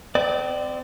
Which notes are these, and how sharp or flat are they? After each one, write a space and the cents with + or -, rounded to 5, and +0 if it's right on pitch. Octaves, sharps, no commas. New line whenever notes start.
C4 -30 D5 +15